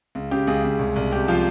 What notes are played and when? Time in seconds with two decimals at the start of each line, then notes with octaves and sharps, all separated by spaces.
0.15 C#2
0.31 C#3 G4
0.47 C#2 G#4
0.64 C#2
0.79 C2
0.96 C2
1.12 C3 G4
1.28 F3 F4